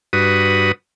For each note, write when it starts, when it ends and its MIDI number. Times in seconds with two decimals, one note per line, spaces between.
0.13 0.72 43
0.13 0.72 66
0.13 0.72 71
0.13 0.72 87